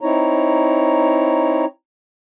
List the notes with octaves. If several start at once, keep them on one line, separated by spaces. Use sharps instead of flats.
C4 D#4 E4 C#5 A#5